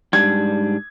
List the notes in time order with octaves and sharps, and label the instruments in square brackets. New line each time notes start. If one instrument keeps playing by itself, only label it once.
[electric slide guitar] G#2 G3 D4 [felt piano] G#6